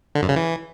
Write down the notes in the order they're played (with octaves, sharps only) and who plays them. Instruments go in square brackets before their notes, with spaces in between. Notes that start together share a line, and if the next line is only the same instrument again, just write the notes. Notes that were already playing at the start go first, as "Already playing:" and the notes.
[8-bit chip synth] D3
F#2
C#3
E3